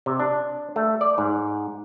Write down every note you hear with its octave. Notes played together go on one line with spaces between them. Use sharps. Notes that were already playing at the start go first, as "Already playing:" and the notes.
C3
D4
A3
D5
G#2